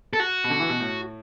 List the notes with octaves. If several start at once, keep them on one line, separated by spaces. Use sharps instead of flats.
A4
F#4
B2
D3
E3
B2
A2